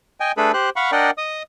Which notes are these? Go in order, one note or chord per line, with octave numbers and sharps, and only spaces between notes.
D#5 G5 G#5
A3 D4 G#4 A4 B4 B5
G4 C5 F#6
F5 F#5 B5 C#6
D4 A#4 D5 D#5 F#5 G5
D#5 D#6